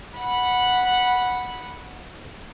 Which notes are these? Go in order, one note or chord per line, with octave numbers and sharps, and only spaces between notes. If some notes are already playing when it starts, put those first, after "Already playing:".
F#5 B5